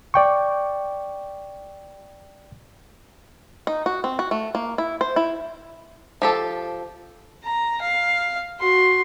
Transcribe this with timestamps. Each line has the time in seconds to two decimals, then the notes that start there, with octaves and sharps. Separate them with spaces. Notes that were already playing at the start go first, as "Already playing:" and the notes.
0.14 D5 G5 C#6
3.67 D#4
3.86 F#4
4.04 C4
4.19 F#4
4.31 A3
4.55 A#3
4.78 E4
5.01 C5
5.16 E4
6.22 F3 G4 A4
7.44 A#5
7.82 F5
8.60 F#4 C6